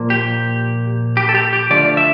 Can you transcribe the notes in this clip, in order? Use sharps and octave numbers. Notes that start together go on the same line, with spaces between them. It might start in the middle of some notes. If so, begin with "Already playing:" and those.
Already playing: A#2 F3 A#3
G4
G4
A4
G4
G4
D3 F3 A3 D5
E5